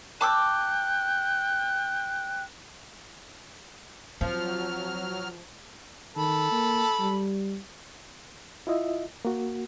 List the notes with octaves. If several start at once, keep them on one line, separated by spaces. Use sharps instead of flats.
G5 A5 D6 E6 F#6
F3 F#3 C4 F6
D#3 A4 B5
A#3
G3
E4 F4 D#5 E5
A#3 F#4